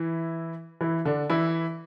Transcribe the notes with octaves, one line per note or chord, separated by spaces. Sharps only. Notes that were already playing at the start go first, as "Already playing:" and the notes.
Already playing: E3 E4
E3 E4
D3 D4
E3 E4